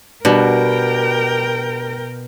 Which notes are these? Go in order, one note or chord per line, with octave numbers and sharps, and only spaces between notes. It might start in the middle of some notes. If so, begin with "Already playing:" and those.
B2 G3 D4 F#4 A#4 G5